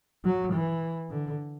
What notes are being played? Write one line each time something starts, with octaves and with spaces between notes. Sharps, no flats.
F#3
E3
D3